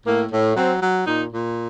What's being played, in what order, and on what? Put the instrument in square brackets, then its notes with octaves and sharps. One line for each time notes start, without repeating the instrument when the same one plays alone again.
[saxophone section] A2 A#3
A2
F#3 C4
F#3
A#2 D#4
A#2